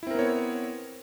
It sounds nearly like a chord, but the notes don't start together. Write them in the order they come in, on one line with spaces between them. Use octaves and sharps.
E4 C4 A#4 B3 C#5